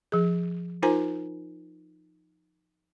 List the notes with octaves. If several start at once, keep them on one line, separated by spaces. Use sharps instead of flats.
F3 G#4
D#4 F4 A#4 C5 G#5 A#5